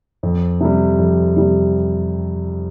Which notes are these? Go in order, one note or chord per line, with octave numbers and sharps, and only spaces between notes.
F2
C3 G3
F2
C3 G3